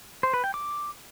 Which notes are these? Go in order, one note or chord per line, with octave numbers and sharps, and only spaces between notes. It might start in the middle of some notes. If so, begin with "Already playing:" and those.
C5
B4
G5
D6